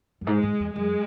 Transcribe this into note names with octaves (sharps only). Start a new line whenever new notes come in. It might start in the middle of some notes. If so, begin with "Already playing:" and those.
F#2
G#2 G#3
G#2
E2
F#2 G#3